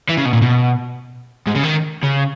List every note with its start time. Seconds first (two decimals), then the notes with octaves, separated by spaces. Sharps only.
0.09 E3
0.18 C#3
0.26 B2
0.33 A#2
0.42 B2
1.47 G#2
1.55 C#3
1.63 D#3
2.03 C#3